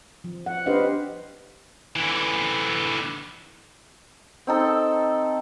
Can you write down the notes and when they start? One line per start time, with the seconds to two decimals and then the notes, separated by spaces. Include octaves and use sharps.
0.24 F3
0.46 F#5
0.66 D4 G4 B4 C5 D#5 F5
1.96 D3 E3
4.47 C4 D#4 A4